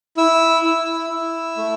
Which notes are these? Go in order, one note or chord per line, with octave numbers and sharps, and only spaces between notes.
E4 E6
E4
E4
A3